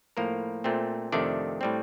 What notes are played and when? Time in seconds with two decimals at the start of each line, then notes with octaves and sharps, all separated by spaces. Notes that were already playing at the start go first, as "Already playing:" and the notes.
0.17 A2 F3 A#3 A#4
0.64 A#2 A3 C4
1.12 F2 C3 D#3 A3 D4 D5
1.61 A2 G3 C4